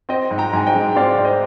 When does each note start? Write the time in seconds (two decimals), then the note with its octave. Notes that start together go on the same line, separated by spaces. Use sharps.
0.09 C4 D#5 G5
0.31 G#2
0.38 G5 A#5
0.53 G#2 G#5
0.67 D#5 G5
0.75 G#3
0.93 G5
0.96 C4 D5 F5
1.18 G#2
1.25 C5 D#5